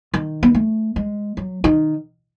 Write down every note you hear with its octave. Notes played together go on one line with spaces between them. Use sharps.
D#3
B3
A3
G#3
F#3
D#3